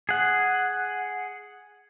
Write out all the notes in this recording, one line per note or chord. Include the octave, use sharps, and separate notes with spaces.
G#4 F#5